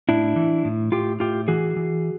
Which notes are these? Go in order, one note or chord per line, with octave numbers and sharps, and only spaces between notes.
A2 D4 E4
E3
A2
A2 F4 G4
A2 F4 G4
E3 F#4 G#4
E3